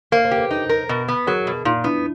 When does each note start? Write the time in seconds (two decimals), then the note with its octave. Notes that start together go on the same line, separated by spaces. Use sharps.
0.12 A#3 A#4 C5
0.25 A#4 C5
0.31 G4
0.38 A4 B4
0.51 D#4
0.69 A#4
0.89 B2
1.08 B3
1.27 F#3 G#4 A#4
1.47 B2
1.65 A#2 D#4 F4
1.84 B3 D4 E4